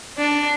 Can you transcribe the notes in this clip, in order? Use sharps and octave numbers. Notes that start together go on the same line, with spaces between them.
D4